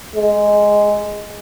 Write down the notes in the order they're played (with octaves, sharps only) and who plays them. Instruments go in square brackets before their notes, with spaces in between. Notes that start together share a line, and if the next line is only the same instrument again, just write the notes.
[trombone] G#3